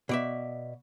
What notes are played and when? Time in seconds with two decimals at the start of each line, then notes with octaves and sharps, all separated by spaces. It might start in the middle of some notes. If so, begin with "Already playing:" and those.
0.09 B2 D5 E5